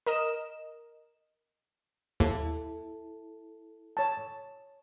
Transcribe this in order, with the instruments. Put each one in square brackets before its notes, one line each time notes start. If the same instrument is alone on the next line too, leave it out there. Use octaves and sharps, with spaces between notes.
[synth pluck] A#4 D#5 E7
[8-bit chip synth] D#2 [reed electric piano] E4 A4
[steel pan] C#5 A5